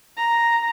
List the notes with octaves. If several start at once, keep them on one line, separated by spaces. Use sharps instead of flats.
A#5